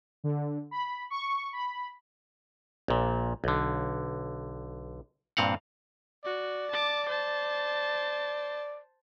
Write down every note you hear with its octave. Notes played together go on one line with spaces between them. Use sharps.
D3
B5
C#6
B5
A#1 A#2
B1 D3
G2 A#2 C4 F5 F#5
F#4 D5
A5 D6
C5 A5